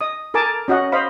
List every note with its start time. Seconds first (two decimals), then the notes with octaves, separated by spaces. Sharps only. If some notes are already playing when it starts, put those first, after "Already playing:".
0.01 D#5 D#6
0.34 A4 A#4 G#5 A5 D6
0.68 C#4 F#4 D#5 F#5
0.92 C5 D#5 F5 B5